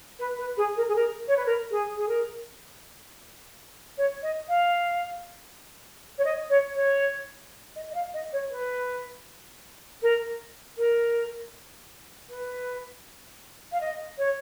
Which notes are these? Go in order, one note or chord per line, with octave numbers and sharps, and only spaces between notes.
B4
B4
G#4
A#4
G#4
A#4
C#5
B4
A#4
G#4
G#4
A#4
C#5
D#5
F5
C#5
D#5
C#5
C#5
D#5
D#5
F5
D#5
C#5
B4
A#4
A#4
B4
F5
D#5
C#5